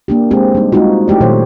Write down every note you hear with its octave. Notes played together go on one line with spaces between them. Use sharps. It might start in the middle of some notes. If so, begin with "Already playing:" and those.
A#3 D4 G4
G#3 C4 G4 G#4
G3 A#3 D#4
G3 G#3 D#4 F4 F#4
A3 E4 G4 D5
A#2 D#3 F#3 C5 C#5